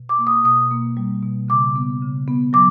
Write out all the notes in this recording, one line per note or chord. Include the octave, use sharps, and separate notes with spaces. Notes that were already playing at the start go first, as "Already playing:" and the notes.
Already playing: B2
D6
A#3
D#6
B2 D#6
A#3
G3
B2
C#3 D6
B3
C#3
B3
F#3 D6